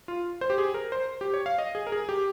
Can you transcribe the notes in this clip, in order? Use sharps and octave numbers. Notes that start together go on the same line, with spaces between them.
F4
C5
G4
G#4
A#4
C5
G4
C#5
F5
D#5
G#4
A#4
G#4
G4